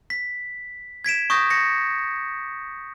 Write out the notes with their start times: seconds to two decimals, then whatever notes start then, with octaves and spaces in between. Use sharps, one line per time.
0.10 B6
1.05 G#6 B6 D7 E7
1.30 C#6 D#6 G6 A#6
1.50 A#6 C#7